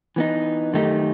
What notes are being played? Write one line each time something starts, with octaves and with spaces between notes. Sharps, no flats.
E3 B3 D#4
F#2 D#3 A3 D#4 G4